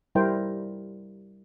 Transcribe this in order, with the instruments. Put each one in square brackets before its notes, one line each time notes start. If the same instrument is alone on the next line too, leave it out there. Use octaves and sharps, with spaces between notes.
[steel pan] G3 E4 A#4 C5 G5